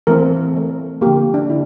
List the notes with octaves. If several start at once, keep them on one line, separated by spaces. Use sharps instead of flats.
E3 A3 C4 A#4
E3 A3 C4
D3 F3 A#3 G4
D4
D3 E4